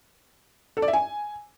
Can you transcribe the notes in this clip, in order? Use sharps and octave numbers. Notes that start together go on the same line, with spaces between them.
A4
D5
E5
G#5